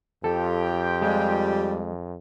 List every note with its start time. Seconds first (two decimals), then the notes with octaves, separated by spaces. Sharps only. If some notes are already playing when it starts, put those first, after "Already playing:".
0.24 F2 F4 G4 A4 G5
1.02 G3 G#3